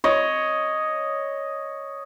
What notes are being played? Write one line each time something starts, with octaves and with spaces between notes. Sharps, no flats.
C#5 D#5